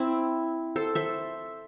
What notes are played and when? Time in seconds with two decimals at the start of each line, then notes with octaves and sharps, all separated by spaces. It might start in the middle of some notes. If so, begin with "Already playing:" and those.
Already playing: C4 E4
0.76 A4 C5
0.95 C5 E5